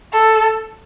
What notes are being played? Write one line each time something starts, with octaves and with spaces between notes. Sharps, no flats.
A4